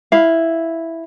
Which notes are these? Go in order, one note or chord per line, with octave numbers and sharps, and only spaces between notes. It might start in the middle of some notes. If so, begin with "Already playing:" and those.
E4 F5